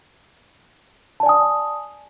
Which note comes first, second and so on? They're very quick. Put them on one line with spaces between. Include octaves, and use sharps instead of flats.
A5 D5 G#5 D#6